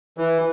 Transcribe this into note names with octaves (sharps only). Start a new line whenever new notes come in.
E3